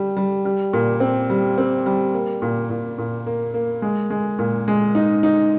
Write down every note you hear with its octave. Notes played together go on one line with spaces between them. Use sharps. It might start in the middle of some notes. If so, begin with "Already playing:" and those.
Already playing: G3
G3
G3
A#2
C4
G3
C4
G3
A#3
A#2
A#2
A#2
A#3
A#3
G#3
G#3
A#2
G#3
D#4
D#4